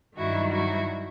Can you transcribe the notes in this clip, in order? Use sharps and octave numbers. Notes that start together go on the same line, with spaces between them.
G2 D#3 F#3 E4 F#4
E4 F#4